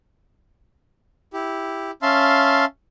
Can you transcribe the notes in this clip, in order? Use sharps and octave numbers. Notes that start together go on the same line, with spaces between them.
E4 G4
C#4 E5 F5 A5 C6